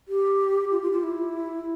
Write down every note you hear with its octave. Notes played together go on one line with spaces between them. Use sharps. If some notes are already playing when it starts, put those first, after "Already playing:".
G4
F4
F4
F4
E4